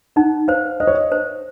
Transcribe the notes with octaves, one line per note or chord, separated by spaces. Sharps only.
D#4 F#5
C5 F5
C5 D#5
C#5
D#5
C5